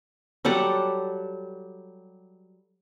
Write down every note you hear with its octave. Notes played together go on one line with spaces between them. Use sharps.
F#3 G3 A4 F#5